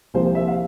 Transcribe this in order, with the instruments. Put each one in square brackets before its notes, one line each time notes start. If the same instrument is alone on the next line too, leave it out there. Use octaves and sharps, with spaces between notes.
[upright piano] C2 C3 F3 A#3 C5
E5
F5